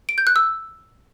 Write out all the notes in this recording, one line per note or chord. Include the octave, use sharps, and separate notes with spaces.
D7
G6
F#6
E6